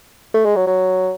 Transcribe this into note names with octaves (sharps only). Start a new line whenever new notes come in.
A3
G#3
F#3
F#3